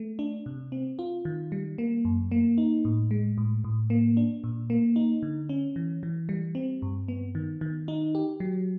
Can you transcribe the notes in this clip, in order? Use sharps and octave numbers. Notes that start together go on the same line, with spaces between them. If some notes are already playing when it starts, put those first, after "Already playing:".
Already playing: A3
D4
C3
C4
F4
D#3
G3
A#3
F#2
A#3
D#4
A2
G#3
A2
A2
A#3
D4
A#2
A#3
D#4
D3
C#4
E3
E3
G3
C4
G2
B3
D#3
D#3
D#4
G4
F#3